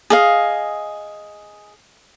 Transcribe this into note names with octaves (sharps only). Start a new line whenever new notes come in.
G#4 D#5 F5